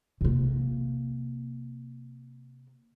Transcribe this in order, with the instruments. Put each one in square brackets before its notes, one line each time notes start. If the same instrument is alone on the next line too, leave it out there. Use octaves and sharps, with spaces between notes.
[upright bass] C3 A#3